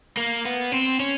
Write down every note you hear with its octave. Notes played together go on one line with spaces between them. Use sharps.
A#3
B3
C4
C#4